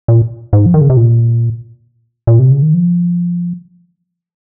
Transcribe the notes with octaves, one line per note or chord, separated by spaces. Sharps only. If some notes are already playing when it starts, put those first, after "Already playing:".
A#2
G#2
F3
D#3
C#3
C3
A#2
A#2
C3
C#3
D#3
F3